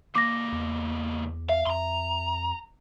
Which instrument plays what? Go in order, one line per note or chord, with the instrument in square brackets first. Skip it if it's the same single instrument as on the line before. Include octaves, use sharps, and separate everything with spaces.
[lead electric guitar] C#2 A#3 [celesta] D6 A#6
[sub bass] E2
[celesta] E5 [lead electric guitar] F5
[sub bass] F2 [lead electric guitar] A#5 C6